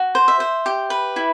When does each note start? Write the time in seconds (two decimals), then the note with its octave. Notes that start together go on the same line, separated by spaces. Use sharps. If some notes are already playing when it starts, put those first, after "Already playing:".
Already playing: F#4
0.15 C5
0.28 E5
0.40 C5
0.66 G4
0.90 B4
1.16 E4